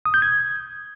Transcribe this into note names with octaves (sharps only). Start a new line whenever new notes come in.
D#6
G6
G#6